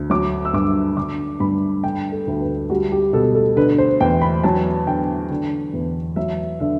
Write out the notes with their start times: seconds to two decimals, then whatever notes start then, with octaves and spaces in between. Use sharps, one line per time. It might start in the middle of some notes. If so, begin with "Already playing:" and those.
Already playing: D2
0.10 F#3 D6
0.45 E6
0.53 G2 D6
0.96 D3 D6
1.40 G2 B5
1.84 D3 G5
2.12 A4
2.27 D2
2.42 B4
2.70 G3 F#4
2.92 G4
3.13 B2 A4
3.35 A4
3.56 D3 B4
3.78 C5
4.01 E2 G5
4.22 B5
4.43 F#3 A5
4.86 D3 G5
5.31 D3
5.74 E2
6.16 F#3 E5
6.60 D3 E5